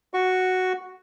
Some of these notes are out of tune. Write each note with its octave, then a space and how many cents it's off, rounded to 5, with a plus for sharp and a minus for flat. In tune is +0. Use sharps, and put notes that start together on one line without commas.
F#4 +0 C#6 +0